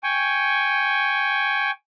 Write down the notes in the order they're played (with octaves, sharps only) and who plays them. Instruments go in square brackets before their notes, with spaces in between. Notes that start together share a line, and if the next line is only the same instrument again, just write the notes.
[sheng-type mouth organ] G5 G#5 C#6